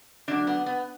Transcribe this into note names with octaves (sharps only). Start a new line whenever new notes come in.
D3 F#3 A3 D4
B3
B3